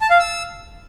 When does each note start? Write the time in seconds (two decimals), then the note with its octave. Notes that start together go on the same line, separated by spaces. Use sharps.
0.01 A5
0.10 F5
0.19 E6